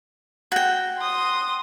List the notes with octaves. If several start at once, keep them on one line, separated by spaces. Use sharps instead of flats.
F#4 G5
C6 D#6